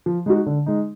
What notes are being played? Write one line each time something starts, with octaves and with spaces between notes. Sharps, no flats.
F3
G#3 D#4 F#4
D3
G#3 D#4